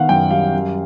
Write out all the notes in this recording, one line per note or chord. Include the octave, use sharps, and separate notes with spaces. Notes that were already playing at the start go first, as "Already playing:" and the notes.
Already playing: D#3 B3 F5 F#5
F#2 G5
G3 F5
F#2